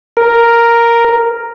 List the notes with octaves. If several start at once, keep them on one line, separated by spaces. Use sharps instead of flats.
A#4